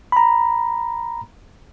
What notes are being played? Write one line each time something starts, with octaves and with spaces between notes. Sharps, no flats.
A#5 B5